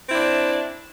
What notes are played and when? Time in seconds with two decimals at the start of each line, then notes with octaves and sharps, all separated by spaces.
0.08 C4
0.10 E4
0.13 D4